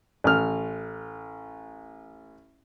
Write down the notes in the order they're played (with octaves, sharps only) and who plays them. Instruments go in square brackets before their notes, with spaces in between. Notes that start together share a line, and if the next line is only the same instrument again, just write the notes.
[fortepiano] A1 F6